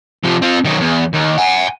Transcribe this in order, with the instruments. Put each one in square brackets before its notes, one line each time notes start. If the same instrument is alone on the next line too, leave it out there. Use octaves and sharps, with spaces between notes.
[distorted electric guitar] C3 F3
C4 F4
D#3 F#3
E2
D#2
F#5 G#5